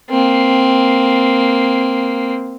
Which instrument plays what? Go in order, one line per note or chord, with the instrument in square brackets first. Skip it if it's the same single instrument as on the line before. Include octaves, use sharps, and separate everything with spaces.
[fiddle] A#3 C4